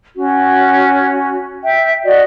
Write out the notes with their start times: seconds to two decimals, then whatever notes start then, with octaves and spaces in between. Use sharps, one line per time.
0.15 C#4 F#4
1.64 E5 G5
2.04 F#4 D5 D#5